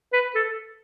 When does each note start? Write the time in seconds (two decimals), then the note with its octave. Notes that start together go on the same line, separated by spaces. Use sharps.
0.13 B4
0.35 A4